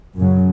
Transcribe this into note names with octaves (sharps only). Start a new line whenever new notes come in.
F#2 C#3 F#3